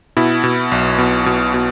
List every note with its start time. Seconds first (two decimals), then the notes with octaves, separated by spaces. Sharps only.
0.17 B2 E4
0.44 B2
0.72 B1
0.98 B2
1.26 B2
1.54 B2